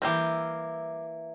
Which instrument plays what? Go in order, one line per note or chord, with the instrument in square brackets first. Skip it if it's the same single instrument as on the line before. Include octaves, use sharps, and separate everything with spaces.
[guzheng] E3 A#3 A#4 [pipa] G3 E4 G4